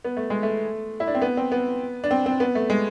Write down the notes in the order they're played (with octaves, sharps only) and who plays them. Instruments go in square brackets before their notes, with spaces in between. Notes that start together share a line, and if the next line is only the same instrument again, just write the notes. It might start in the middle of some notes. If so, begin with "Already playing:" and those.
[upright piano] B3
A3
G#3
A3
E4
D4
C4
B3
C4
B3
D4
C4
C4
B3
A3
G#3